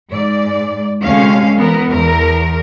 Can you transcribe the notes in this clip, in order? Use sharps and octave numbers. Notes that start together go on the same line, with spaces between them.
G#2 D5
D2 C3 G#3 A3 C#4 F5
E3 B3 A#4
E2 A#4